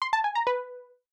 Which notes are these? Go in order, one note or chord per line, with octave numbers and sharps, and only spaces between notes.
C6
A5
G#5
A#5
B4